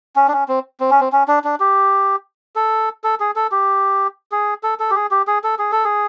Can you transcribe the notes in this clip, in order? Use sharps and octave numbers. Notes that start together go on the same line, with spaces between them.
C#4
D4
C#4
C4
C4
C#4
C4
C#4
D4
D4
G4
A4
A4
G#4
A4
G4
G#4
A4
A4
G4
G#4
G4
G#4
A4
G#4
A4
G#4